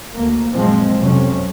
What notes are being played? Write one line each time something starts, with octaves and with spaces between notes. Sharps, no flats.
D2 A#3
F#2 A#2 F3 G#3 C4
B1 F2 C3 C#4